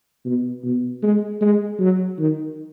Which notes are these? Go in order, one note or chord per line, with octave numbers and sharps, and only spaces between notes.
B2
B2
G#3
G#3
F#3
D#3